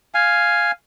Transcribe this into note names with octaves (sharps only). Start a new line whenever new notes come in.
F5 G#5